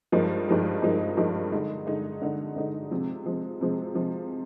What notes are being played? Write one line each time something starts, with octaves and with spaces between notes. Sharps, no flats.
G2 F3 G#3 D#4 A#4
G2 F3 G#3 D#4 A#4
G2 F3 G#3 D#4 A#4
G2 F3 G#3 D#4 A#4
D3 G#3 D#4
D3 G#3 D#4
D3 G#3 D#4
D3 G#3 D#4
C3 F3 G#3
C3 F3 G#3
C3 F3 G#3
C3 F3 G#3